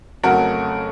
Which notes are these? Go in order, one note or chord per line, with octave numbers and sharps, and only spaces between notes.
F2 C#3 F#3 A3 F#4 A#4